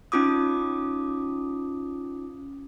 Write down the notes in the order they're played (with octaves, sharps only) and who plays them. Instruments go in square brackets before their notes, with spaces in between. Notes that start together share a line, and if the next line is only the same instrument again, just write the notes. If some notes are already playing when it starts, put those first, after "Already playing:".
[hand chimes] C#4 D#4 F4 D6 D#6